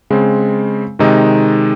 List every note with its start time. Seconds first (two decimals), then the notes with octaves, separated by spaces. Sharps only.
0.10 C#3 G#3 C4
0.99 C3 D#3 G#3 D#4